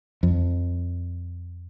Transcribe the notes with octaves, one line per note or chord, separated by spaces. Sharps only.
F2